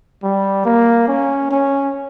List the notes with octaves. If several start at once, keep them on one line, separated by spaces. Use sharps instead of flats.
G3
A#3
C#4
C#4